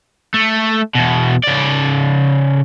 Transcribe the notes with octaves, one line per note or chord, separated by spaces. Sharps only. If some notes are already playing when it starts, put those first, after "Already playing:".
A3
E2 B2
C#3 D5